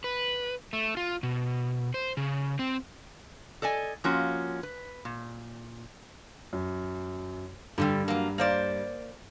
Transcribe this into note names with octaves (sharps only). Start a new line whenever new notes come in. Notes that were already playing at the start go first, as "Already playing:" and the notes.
B4
A3
F4
B2
C5
C#3
C4
A4 D5 D#5 G#5
F3 A#3 C#4 F4 F#4
B4
A#2
F#2
G2 D3 E3 G3
F#3 A#3
A#3 C5 D5